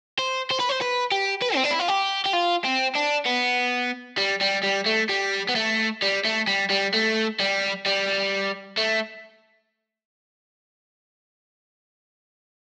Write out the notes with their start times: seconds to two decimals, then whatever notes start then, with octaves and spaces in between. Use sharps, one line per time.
0.19 C5
0.51 C5
0.59 B4
0.69 C5
0.81 B4
1.12 G4
1.42 B4
1.55 C4
1.64 D4
1.71 E4
1.80 F4
1.88 G4
2.26 G4
2.33 F4
2.65 C4
2.96 D4
3.26 B3
4.18 G3
4.41 G3
4.64 G3
4.86 A3
5.09 G3
5.49 B3
5.56 A3
6.02 G3
6.25 A3
6.47 G3
6.70 G3
6.94 A3
7.40 G3
7.86 G3
8.77 A3